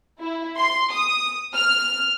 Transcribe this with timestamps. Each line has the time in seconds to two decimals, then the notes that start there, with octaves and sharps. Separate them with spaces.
0.20 E4
0.57 C6
0.91 D#6
1.54 F6